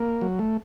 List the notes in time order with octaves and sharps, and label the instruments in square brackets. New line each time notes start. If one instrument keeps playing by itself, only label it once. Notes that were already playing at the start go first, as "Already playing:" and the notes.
Already playing: [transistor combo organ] A#3
F#3
A3